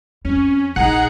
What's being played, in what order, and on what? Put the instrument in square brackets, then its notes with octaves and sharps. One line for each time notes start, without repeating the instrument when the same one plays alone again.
[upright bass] F2 [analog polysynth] C#4
[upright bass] A#1 [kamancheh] D#4 A#5 [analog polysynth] G#4 [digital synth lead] F#5